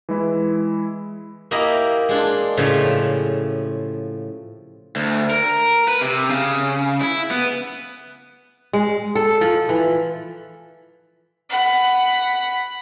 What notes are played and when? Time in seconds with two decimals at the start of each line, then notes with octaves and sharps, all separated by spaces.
0.09 E3 G#3 E4
1.51 A#3 E4 G4 D#5 A#5
2.09 G#3 D4 F4
2.57 A2 C#3 F3 G4
4.96 D2
5.31 A#4
5.88 B4
6.01 C3
6.30 C#3
7.01 E4
7.31 B3
8.73 G#3
9.15 A4
9.41 F3
9.69 E3
11.49 F#5 B5